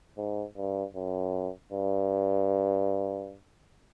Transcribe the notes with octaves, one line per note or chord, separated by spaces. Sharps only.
G#2
G2
F#2
G2